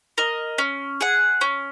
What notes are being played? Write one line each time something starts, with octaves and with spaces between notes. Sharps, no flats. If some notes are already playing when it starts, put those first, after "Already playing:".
A#4 D#5
C#4
G#4 F#5
C#4